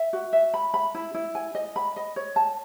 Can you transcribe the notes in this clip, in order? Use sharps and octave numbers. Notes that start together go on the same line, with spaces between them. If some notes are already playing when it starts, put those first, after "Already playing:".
Already playing: E5
F#4
E5
B5
B5
E4
E4
G#5
D#5
B5
D#5
C#5
A5